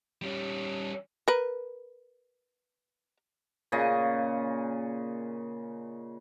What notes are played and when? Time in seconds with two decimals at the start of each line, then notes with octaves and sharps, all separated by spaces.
0.22 G3 C#4
1.28 A#4 B4
3.72 A#2 C#3 D#5